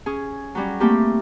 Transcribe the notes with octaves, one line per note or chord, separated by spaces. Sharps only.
C#4 G#4
F#3 G3 C#4
A3 A#3 C4 E4 G4